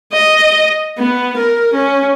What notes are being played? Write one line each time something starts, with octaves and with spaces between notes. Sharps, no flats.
D#5
B3
A#4
C#4